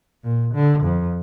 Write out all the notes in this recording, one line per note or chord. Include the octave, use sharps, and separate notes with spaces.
A#2
D3
F2